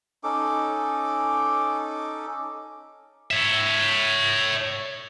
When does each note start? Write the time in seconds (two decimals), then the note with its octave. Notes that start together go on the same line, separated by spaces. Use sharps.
0.24 C#4 D#4 A4 D6
3.31 C#5 E5